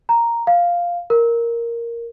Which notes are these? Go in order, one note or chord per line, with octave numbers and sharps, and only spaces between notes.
A#5
F5
A#4